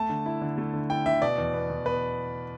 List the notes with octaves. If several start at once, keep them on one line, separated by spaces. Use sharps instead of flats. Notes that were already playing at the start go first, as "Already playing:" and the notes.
Already playing: A3 A5
D3
E4
D3
A3
D3
E4 G5
D3 E5
B2 D5
E2
B3
E2
B2 B4